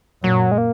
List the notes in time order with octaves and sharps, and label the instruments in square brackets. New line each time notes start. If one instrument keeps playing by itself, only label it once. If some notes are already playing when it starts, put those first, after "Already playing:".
[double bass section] F#2 A#2 [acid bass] F#3
[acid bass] G#3
A#3